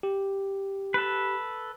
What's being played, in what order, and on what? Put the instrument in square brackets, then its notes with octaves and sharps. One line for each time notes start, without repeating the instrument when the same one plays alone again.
[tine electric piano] G4
[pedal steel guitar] A4 B4